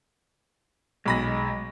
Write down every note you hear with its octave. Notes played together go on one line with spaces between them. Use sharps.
B1 G#3 B5 A#6